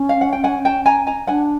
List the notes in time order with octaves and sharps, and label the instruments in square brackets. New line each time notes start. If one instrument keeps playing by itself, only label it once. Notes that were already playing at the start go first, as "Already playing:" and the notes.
Already playing: [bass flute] C#4
[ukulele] F5
F#5
G5
F#5 G#5
G5 A5
G#5 A#5
G#5 A#5
[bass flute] D4 [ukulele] F#5 G#5